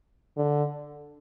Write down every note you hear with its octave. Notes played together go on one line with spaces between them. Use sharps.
D3